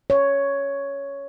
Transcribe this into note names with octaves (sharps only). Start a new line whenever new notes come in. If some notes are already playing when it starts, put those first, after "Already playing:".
C#5